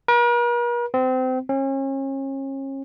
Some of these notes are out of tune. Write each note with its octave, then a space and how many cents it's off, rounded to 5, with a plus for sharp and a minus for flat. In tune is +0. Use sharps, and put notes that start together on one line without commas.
A#4 +45
C4 -25
C#4 -35